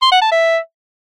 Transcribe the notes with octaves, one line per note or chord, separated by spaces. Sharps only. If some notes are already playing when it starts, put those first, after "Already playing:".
C6
F#5
A5
E5